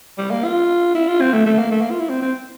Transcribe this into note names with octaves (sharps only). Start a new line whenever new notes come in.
G3
A#3
F4
E4
F4
C4
A3
A3
A#3
A3
A#3
F4
E4
C4
C4